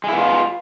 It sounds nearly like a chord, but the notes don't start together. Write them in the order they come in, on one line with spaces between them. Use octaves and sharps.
G#3 E4 B3 F4